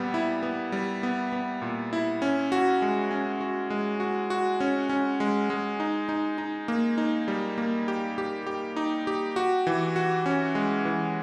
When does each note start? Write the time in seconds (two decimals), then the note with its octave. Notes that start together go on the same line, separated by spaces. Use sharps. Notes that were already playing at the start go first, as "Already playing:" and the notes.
Already playing: A#2 G3 B3
0.14 E4
0.43 B3
0.72 G3
1.03 B3
1.33 B3
1.62 A#2
1.93 E4
2.22 C#4
2.52 F#4
2.82 G#3
3.11 C#4
3.41 F#4
3.70 G#3
4.00 F#4
4.30 F#4
4.60 C#4
4.89 C#4
5.20 G#3
5.50 G#3
5.80 D#4
6.09 D#4
6.38 D#4
6.68 A#3
6.98 D#4
7.28 G3
7.58 A#3
7.88 G4
8.18 G4
8.47 G4
8.76 D#4
9.07 G4
9.36 F#4
9.67 E3
9.96 F#4
10.26 C#4
10.55 G#3
10.85 E3